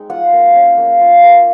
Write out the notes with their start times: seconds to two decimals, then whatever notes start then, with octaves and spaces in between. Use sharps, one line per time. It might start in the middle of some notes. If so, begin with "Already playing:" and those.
Already playing: G#3 C4 D#4
0.09 F4 F#5
0.33 A#3
0.55 C#4
0.78 A#3
1.01 F4
1.23 A#3